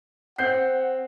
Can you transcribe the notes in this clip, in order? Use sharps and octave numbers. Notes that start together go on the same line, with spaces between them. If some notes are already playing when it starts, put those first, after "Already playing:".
C4 F#5 G6 C7